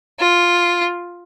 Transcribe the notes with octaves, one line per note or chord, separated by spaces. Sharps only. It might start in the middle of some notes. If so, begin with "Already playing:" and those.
F4